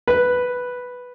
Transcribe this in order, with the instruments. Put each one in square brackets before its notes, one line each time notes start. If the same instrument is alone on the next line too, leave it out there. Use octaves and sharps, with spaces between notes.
[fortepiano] B4